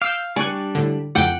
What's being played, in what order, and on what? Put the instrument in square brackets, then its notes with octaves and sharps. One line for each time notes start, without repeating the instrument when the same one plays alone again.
[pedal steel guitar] F5 [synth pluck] D6 E6 G6
[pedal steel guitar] G3 D4 [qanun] D5 [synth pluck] G#5 C#6 F#6
[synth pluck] A2 D3
[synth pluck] F2 D6 [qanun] F#5 G5